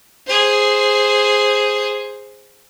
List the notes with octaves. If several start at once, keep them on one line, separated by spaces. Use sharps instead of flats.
G#4 C5